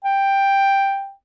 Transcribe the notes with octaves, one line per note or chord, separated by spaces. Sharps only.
G5